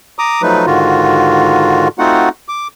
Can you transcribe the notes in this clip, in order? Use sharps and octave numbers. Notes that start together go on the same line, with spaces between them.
A#5 D6 D#6
F3 F#3 A3 D#4 B4
G#2 D3 D#3 F4 F#4
A3 C4 D#4 F4 F#4 F#5
D6